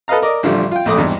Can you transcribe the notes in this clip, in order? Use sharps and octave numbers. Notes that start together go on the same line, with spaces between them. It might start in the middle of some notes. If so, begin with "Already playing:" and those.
A4 B4 D#5 F5 A#5
A#4 D5 D#5
A1 D3 F3 G3
F4 G5
A#1 F2 A3 D5 D#6
G#1 E2 G2